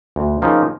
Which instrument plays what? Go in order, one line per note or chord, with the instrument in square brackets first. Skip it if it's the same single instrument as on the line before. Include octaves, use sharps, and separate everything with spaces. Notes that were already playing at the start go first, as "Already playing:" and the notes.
[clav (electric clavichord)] D2
C#3 F3 A#3 D#4